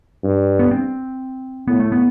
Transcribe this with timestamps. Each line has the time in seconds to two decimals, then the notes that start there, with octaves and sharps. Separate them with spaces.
0.24 G2
0.59 B3
0.71 C4
1.68 A2 B3
1.80 A3
1.92 B3